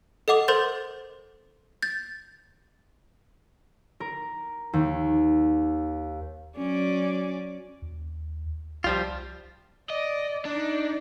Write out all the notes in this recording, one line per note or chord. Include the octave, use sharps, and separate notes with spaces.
A4 D#5 F#5 D6 F7
A4 A#4 C5 C6 G6 A6
G6 A6
A#4
D#2
F#3 C#4 D5
D#2
C2 F3 G3 F4
D5 D#5
D4 D#4 D5